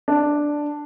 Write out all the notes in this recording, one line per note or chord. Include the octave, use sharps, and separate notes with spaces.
D4